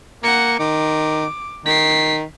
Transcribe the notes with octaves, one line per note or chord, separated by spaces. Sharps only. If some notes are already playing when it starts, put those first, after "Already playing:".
A#3 F#5 C#7
D#3 D6
D#3 B6 C7